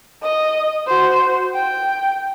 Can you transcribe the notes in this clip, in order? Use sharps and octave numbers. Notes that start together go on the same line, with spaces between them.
D#5
F#4 C5
G5